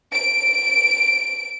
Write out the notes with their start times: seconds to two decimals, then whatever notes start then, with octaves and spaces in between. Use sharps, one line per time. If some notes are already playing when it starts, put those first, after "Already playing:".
0.13 D7